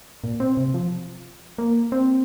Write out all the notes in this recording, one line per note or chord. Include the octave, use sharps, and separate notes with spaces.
A#2
C4
C3
F3
A#3
C4